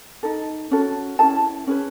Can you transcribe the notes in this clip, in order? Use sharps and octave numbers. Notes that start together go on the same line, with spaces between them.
D#4 A4
C#4 F#4 A4
C#4 E4 G#4 A5
C#4 G#4 B4